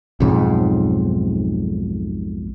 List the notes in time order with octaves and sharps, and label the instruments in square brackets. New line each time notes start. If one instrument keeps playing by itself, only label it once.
[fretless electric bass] B1 F2 G#2